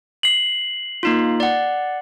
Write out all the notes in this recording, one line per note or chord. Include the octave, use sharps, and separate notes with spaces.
C7 F#7
A#3 D#4 F4
D5 F#5